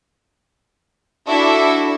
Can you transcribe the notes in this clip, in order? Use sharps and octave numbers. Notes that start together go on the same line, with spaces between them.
D4 E4 F#4 A4 E5